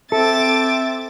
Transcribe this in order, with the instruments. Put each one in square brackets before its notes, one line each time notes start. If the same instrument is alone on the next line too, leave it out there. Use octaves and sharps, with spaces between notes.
[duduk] C4 [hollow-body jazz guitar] A4 [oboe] E5 [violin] D6 A6